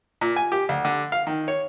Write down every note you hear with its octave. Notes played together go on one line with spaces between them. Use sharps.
A#2
G#5
G4
D2
D3
F5
D#3
C#5